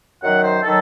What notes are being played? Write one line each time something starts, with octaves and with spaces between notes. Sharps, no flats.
F#2 D#3 F#3 F#5
C5
D#3 F#3 A4